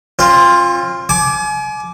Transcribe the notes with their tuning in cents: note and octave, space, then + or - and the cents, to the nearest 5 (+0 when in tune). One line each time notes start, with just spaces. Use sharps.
C4 +40 F4 +0
G#5 +35 D6 +0